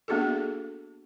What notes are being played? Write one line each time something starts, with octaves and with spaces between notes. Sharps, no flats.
A#3 B3 D4 F#4 G#4 A4